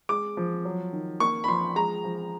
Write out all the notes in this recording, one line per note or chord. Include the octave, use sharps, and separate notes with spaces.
G#3 D6
F3
F#3
D#3
A#3 C#6
B5
F3 C6
G#3 A#5
F3